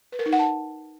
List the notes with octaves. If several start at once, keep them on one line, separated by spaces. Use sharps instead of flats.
B4
A#4
D#4
F#5
A5